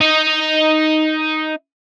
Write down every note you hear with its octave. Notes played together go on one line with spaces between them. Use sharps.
D#4 D#5